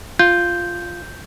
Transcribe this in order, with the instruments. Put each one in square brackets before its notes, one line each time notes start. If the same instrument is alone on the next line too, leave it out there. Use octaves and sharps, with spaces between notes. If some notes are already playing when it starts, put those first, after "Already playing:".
[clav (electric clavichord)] F4 [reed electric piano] G6